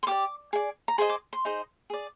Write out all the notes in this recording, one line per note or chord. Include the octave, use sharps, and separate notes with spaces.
C6
G4 D5 D6
G#4 D5
A#5
G#4 C5 D#5 C6
D6
C6
D#4 G#4 C5 D#5
G#4 D5